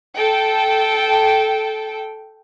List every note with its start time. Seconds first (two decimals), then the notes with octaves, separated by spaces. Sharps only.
0.15 A4 G5